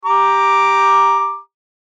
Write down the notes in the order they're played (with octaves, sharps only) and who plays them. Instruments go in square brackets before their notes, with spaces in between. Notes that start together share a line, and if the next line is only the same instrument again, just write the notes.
[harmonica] G4 A#5 D6